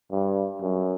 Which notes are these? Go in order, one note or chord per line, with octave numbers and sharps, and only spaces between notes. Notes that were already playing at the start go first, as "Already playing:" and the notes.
G2
F#2